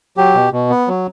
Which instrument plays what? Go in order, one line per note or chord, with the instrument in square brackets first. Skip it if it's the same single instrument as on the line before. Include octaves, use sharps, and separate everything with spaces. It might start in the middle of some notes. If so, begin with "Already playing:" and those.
[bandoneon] F#3 G4
B2
B2
B3
F#3